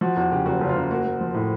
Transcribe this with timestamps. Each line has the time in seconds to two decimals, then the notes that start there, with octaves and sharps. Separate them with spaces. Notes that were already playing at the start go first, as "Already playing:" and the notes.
0.01 F3 F#4
0.16 E2 F#4
0.32 C#3 G4
0.46 F#1 F#4
0.61 F#1
0.69 F4
0.75 F#1
0.91 A#3 F#4
1.05 A#3
1.21 F3
1.34 A2